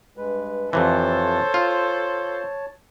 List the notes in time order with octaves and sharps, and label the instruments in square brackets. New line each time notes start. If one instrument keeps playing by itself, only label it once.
[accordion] G2 G#3 B4
[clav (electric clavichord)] F2 C3 E3 [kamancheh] A4 C5 [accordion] C#5 A5
[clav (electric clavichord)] F4